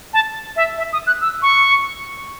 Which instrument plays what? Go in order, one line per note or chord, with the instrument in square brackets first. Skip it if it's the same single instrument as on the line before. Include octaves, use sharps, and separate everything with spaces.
[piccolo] A5
E5
E5
D#6
F#6
E6
C#6